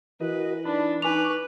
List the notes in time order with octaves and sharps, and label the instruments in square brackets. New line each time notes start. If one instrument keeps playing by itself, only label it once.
[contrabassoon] E3 [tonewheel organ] F#4 A#4 D#5 [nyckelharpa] B4
[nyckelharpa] D4 [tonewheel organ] D#4 A5 B5
[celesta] D#4 G#5 F7 [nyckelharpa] B4 [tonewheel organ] C#6 D6